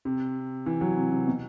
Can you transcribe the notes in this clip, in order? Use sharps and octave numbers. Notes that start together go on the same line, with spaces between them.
C3
E3
F#3
C3
C3
B2